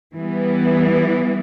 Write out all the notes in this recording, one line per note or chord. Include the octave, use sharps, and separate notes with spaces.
E3 G3 B3